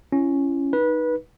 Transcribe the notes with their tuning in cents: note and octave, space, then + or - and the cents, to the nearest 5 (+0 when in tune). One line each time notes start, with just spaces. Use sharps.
C#4 +0 E4 +35
D#4 +0 B4 -20